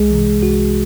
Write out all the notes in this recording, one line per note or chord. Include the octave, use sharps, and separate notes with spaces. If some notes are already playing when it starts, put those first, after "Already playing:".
Already playing: C2 G#3 G#4
C3 E3
C2 F#4